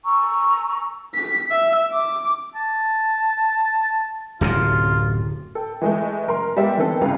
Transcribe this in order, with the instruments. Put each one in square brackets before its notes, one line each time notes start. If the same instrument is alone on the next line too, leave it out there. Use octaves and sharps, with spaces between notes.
[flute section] G#5 A#5 C#6 E6
[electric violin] B6
E5
D6
[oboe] A5
[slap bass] D1 F#2 C3 [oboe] F4
[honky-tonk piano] A4 G5
E3 G#3 A3
F#1 A#4 C6
G3 G#3 B3 G4 D5 E5
D#3 E3 B3 C4 A4
G1 C2 C#3 B4 F5